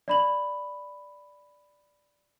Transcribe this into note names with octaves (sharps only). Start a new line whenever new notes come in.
D5 B5 F#7